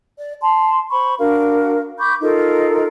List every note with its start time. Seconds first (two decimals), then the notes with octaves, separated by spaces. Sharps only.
0.19 D5
0.41 A5 C6
0.90 C5 B5 C#6
1.19 D4 F#4 A#4 F5
1.98 B5 C#6 D6 G6
2.22 D#4 F4 A4 A#4